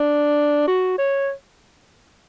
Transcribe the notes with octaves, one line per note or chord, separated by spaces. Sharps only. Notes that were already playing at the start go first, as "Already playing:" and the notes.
Already playing: D4
F#4
C#5